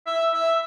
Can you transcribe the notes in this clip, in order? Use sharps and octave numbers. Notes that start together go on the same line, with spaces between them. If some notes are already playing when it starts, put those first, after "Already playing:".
E5
E5